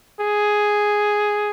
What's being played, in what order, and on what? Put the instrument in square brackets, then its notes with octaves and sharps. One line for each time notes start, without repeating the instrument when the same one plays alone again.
[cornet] G#4